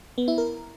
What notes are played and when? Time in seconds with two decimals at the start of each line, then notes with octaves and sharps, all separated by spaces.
0.18 B3
0.28 E4
0.38 A#4